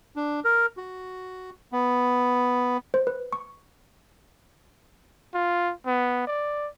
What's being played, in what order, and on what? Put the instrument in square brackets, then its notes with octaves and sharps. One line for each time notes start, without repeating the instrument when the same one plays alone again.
[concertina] D4
A#4
F#4
B3
[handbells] C5
B4
C#6
[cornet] F4
B3
D5